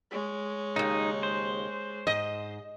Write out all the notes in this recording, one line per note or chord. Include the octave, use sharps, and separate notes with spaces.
G#3 C#5
D#2 C#3 D#4
C5
G#2 D#5